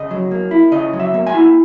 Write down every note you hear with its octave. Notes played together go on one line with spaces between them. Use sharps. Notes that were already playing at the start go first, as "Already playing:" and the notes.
Already playing: C#3 D#5
F#3
A#3
E4
C#3 D#5
F#3
E5
A#3
G#5
E4